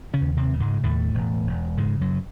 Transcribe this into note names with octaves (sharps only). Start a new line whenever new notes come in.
C#3 C#4
D#2
C3 C4
C#3
G#2 G#3
D#2 A2 A3
E1
E1
G#2 C#3 G#3
F#2 F#3